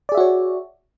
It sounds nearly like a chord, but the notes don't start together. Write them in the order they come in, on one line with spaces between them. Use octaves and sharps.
D5 G#4 E5 F#4 C#5